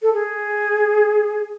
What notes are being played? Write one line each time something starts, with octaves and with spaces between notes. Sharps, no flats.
A4
G#4